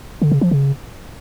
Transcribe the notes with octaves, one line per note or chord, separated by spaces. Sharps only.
D3
C#3
F3
C#3